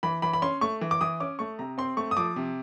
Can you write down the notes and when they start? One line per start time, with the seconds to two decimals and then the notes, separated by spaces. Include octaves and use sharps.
0.03 E3 B5
0.22 E3 B5
0.33 B5
0.42 C#4 C6
0.61 A3 C#6
0.81 E3
0.91 D6
1.01 E3 D#6
1.20 C#4 D6
1.39 A3 C#6
1.59 C3 A#5
1.78 C4 C6
1.97 A3 C#6
2.11 D#6
2.17 F3 D6
2.36 C3